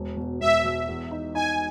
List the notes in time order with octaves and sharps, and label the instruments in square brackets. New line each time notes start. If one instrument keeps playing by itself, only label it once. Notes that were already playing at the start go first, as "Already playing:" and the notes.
Already playing: [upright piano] E1
B2
[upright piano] E1 [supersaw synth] E5
[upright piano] B2
E2
D#4
[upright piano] D#4 [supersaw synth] G#5